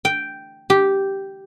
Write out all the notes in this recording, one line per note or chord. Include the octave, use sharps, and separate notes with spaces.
G5
G4